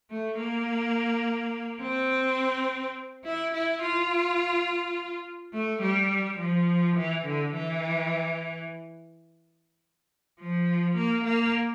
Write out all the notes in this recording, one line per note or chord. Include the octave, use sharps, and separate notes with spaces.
A3
A#3
C4
E4
E4
F4
A3
G3
F3
E3
D3
E3
F3
A#3
A#3